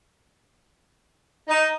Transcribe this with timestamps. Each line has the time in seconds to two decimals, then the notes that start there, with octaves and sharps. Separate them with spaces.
1.48 D#4